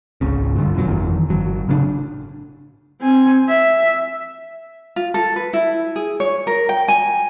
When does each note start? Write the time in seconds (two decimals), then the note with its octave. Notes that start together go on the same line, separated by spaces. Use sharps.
0.21 G#1 C#2 C#3
0.56 G2 D3 F3
0.74 F#2 B2 F#3
0.87 G1 F2 D#3 E3
1.29 G1 F#3
1.67 A2 C#3 D4
3.01 C4 G#5
3.48 E5
4.96 F4
5.14 A4
5.36 B4
5.53 E4
5.96 G#4
6.20 C#5
6.47 A#4
6.69 G5
6.88 G#5